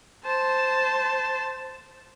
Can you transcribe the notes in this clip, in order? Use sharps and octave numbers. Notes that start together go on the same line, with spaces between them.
C5 A5